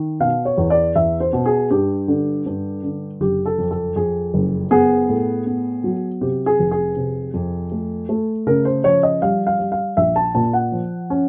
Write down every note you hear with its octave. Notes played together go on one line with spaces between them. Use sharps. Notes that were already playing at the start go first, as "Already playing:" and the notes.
Already playing: D#3
B2 F5
C#5
E2
D5
E2 E5
C5
B2
G#4
G2 G4
D3
G2
D3
F#1 G4
A4
F2
A4
F2 G#4
F#1
B3 G#4
A2
B3
F#3
C3 G4
G#4
F1
G#4
C3
F2
A3
A3
C#3 A#4
C5
F3 C#5
D#5
G3 F5
F5
G3
F5
A#1 E5
A5
A#2 A5
F#5
F3
C#4